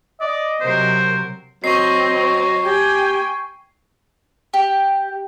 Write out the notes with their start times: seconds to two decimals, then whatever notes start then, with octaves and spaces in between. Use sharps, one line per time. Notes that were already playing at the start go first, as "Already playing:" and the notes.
0.21 D5 D#5
0.61 C3 F#3 A#4 C5
1.64 F#3 C4 D#5 C#6 C7
2.65 G4 G5 G#5
4.54 G4